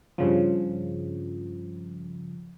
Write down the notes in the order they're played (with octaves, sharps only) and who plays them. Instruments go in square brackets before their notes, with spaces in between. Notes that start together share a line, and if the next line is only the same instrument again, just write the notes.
[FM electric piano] G2 C#3 F3